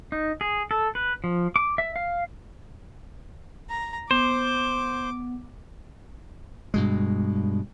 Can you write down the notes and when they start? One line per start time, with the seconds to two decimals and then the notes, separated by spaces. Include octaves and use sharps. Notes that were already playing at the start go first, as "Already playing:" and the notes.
0.12 D#4
0.41 G#4
0.71 A4
0.95 B4
1.24 F3
1.56 D6
1.78 E5
1.96 F5
3.70 A#5
4.11 B3 C5 D6
6.74 G2 B2 G#3